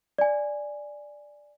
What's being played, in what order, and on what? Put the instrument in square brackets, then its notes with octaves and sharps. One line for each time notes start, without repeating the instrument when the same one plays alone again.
[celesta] D5 G#5